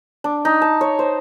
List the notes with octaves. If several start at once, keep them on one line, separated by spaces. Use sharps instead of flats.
D4
D#4
A5
C#5
C5